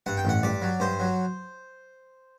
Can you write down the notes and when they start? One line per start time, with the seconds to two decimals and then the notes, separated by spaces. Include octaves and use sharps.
0.06 G2 F#5
0.17 G5
0.25 A1 F#5
0.43 G2 D5
0.62 F#3
0.80 G2 C5
1.00 F#3